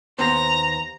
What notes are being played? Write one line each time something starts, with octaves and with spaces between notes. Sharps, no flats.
D#2 B3 C5 A#5